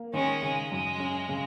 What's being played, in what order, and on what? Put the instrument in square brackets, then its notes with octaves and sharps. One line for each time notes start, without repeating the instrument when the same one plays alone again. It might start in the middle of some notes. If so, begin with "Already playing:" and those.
Already playing: [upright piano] A#3
[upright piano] D#3 [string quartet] G#3 C#4
[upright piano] C#3 [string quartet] G#3
[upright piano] F#2 [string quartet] G#3
[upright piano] C#4
C#3